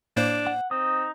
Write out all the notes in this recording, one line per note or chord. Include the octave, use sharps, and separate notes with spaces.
A2 A#3 D4 C5
F#5
C4 D#4 D#6